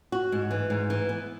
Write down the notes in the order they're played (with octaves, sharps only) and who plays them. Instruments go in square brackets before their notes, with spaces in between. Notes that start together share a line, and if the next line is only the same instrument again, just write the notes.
[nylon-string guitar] F#4
G#2
E3
G#2
E3
B3